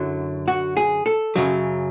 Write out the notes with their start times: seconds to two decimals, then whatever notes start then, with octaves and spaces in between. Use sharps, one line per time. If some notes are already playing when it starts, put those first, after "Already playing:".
Already playing: F#2 D3 F#3 E4
0.48 F#4
0.77 G#4
1.06 A4
1.36 F#2 C#3 F#3